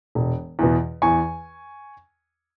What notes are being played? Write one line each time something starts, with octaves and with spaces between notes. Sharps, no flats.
E1
E2 B2
E2 G#5 C#6